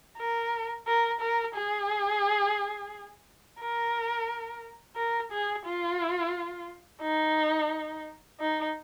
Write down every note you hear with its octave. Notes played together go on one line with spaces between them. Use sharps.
A#4
A#4
A#4
G#4
A#4
A#4
G#4
F4
D#4
D#4